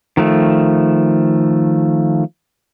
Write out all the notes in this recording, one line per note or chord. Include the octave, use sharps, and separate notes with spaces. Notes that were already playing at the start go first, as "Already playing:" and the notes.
D#3 F3 A3